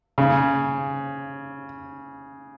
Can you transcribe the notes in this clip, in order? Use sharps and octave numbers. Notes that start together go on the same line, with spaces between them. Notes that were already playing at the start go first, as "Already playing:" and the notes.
C#3